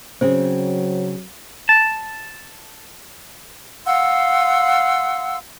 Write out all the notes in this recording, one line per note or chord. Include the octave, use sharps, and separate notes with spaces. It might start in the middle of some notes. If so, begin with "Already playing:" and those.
C#3 F#3 C4 G#4 C5
A5
F5 F#5 C6 E6